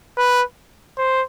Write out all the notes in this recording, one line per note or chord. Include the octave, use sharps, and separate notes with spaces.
B4
C5